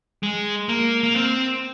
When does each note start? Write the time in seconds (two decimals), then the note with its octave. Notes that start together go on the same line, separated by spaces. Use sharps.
0.23 G#3
0.69 A#3
1.03 A#3
1.14 C4